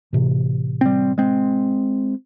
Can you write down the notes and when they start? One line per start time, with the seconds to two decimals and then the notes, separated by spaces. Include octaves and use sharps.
0.13 A2 C3 E3
0.81 G3 C4
1.18 G#3 C4